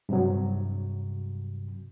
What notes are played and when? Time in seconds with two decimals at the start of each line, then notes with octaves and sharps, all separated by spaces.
0.09 G2 C3 F#3